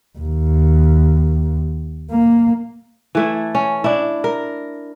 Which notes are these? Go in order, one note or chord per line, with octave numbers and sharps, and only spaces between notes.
D#2
A#3
E3 A3 E4
C#4
D4 E4
A#4